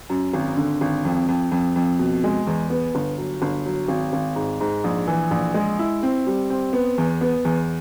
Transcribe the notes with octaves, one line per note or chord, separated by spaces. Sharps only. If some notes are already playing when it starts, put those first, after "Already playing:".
F#2
G#1
D3
G#1
F2
F2
F2
F2
B2
G#3
E2
B3
G1
F#3
G1
F#3
G#1
G#1
G#2
G#2
A#1
E3
A#1
G#3
E4
C4
G3
C4
B3
E2
B3
E2